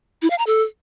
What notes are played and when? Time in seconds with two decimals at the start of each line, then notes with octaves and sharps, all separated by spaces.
0.22 E4
0.30 F5
0.38 A#5
0.47 A4